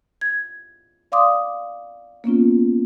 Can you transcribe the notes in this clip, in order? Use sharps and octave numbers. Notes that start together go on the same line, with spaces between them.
G#6
D5 F5 C6 D6 D#6
A#3 B3 C#4 F4